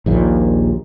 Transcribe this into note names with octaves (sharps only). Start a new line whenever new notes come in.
A#1 D#2 A#2